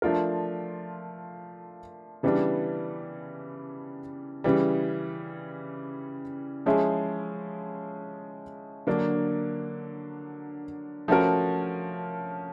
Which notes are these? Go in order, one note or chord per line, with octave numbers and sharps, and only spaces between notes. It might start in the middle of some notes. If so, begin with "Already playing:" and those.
F3 A3 D4 F4 A#4
C#3 E3 G3 B3 D4
C#3 E3 G3
F3 G#3 C#4 E4 G#4
D3 F#3 A#3 D4
F3 A3 C#4 F#4 A#4